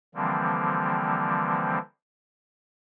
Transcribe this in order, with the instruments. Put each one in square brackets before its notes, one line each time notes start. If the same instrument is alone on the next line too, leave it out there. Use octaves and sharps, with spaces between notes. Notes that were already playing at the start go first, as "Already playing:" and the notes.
[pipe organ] D3 E3 F3 G3 A#3 C4